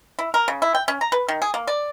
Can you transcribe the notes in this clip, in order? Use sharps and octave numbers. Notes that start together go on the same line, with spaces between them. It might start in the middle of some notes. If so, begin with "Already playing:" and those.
E4
A#4
C#3
E4
G5
C#4
A#5
B4
D#3
G#4
A#3
D5